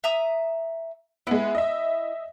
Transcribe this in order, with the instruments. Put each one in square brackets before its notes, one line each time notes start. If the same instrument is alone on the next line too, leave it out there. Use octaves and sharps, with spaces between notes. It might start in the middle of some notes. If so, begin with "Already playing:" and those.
[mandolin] E5 A#5 D#6
[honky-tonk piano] G#3 B3 [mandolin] E4
[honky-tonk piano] D#5 E5